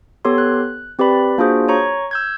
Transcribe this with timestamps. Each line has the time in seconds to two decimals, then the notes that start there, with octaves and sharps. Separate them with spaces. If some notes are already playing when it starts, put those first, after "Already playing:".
0.25 B3 G4 A4 C#5 C6
0.38 F#6
0.99 C4 G4 B4 D5 B5
1.38 A#3 D4 F4 F#4 G#4 C5
1.68 C#5 A#5 C#6
2.11 E6 G6 G#6